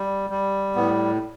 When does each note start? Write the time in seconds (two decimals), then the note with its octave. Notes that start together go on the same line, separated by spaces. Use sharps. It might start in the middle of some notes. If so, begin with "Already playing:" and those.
Already playing: G3
0.30 G3
0.76 A2 B3